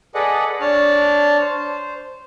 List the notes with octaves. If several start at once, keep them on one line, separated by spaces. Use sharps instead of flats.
G#4 A4 B4 D5 D#5 F#5
D4 C#5 A5 F6
C5